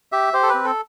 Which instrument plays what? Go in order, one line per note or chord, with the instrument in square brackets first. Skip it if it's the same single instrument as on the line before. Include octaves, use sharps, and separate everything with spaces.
[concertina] G4 E5
G4 C5
A4
B4
C4
A4